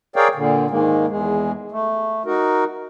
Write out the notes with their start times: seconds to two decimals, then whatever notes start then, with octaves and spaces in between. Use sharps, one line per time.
0.16 G#4 A#4 C#5 D5 F5 G5
0.35 A#2 D3
0.70 G#2 D#3 G#3 A#3
1.09 E2 G#3
1.72 A3
2.25 D#4 F#4 A#4